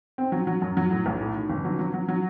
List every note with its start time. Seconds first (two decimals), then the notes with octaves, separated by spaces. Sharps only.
0.18 C4
0.32 F#3
0.47 F#3
0.62 F#2
0.77 F#3
0.91 A2
1.06 B1
1.21 A2
1.35 D#3
1.50 G1
1.65 F#3
1.79 F#3
1.94 F#3
2.08 F#3